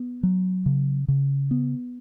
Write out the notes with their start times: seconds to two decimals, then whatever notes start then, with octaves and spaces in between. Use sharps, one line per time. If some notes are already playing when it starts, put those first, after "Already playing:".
Already playing: B3
0.23 F#3
0.66 C#3
1.08 C#3
1.51 B3